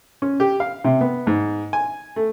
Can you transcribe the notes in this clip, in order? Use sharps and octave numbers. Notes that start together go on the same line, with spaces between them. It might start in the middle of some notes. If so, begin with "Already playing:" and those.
C#4
G4
F5
C3
B3
G#2
G#5
A3